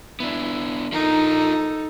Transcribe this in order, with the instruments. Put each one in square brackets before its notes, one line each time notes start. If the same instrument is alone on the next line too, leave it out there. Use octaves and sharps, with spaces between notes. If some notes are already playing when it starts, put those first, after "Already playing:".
[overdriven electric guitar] B3 D4 [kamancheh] E4
[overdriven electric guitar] F3 A#4 [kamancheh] D#4 A4